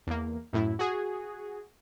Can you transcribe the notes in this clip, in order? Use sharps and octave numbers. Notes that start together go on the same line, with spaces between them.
E2 A#3
F#2 A2 E4
F#4 G#4